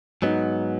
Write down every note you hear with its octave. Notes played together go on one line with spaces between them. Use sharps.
G#2 F#3 B3 D#4